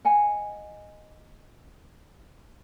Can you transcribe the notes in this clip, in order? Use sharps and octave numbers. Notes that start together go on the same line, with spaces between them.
D#5 F#5 G#5